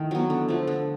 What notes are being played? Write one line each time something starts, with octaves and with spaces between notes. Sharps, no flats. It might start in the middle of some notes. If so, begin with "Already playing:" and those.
Already playing: D#3 A3 E4
F#3 B3
D3
F3 A3
D3